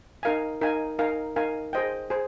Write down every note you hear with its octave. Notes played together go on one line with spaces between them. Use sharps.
D#4 A#4 F5 G#5
D#4 A#4 F5 G#5
D#4 A#4 F5 G#5
D#4 A#4 F5 G#5
G#4 C5 D#5 G5
G#4 C5